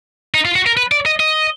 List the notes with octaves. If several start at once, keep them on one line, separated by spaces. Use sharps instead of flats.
D#4
F4
F#4
A#4
B4
D5
D#5
D#5